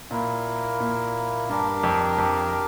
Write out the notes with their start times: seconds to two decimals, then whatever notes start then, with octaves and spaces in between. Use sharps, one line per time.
0.11 A#2 A#3 E4 A#4
0.80 A#2
1.49 G2 D4 G4 A#4
1.83 F2
2.18 F2